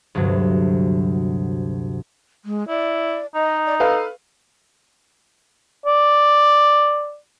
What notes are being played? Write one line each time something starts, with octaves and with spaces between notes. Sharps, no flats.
D2 G2 C3 F#3
G#3
E4 D5
D#4 D#5
D5
A4 B4 F5
D5